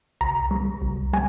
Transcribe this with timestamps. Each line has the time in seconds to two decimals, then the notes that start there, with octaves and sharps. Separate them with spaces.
0.21 C2 A#5
0.51 G3
0.82 C2
1.13 G3 G#5